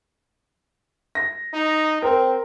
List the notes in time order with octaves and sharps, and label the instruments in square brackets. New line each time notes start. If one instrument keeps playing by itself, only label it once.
[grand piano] A#6
[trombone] D#4
[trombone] C4 [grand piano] A#4